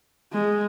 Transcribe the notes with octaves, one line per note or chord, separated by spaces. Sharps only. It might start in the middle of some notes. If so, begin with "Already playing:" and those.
G#3